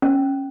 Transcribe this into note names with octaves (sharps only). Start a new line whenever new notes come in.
C#4